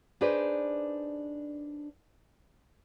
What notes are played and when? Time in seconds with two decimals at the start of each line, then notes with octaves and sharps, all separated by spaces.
0.21 D4 D#4 G#4 B4 C5 D5